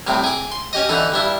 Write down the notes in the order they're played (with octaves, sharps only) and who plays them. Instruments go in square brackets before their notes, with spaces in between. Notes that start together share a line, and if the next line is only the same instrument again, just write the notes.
[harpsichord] C2 A2 C3 D6
G#4 D6
C6
C#4 G4 D#5
D3 E3 D#4 A4
G2 D4 E4